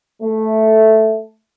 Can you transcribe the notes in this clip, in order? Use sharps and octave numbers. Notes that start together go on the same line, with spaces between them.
A3